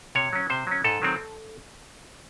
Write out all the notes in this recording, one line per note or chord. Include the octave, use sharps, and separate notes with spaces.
C3 C#5
F#3 C#4
C3 C5
F#3 C#4
G#2 A4
D#3 F#3 C4